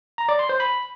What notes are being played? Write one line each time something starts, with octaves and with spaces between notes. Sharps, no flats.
A#5
D5
C6
C5
B5